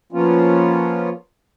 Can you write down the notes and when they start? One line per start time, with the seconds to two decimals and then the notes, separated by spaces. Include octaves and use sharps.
0.12 F3 A#3 B3 C#4 F4